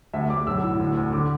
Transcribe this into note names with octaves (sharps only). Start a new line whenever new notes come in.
D2 E5
D2 D6
B1 E6
A2
D2
D2
D3 D6